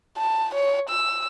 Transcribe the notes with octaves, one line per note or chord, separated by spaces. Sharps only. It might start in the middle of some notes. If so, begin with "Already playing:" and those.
A5
C#5
E6